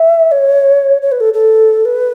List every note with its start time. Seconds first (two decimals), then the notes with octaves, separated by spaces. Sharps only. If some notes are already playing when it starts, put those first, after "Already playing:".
Already playing: E5
0.32 C#5
1.02 C#5
1.12 B4
1.20 A4
1.34 A4
1.85 B4